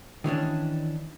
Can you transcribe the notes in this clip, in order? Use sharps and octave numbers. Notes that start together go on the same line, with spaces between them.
D#3 E3 C#4 D4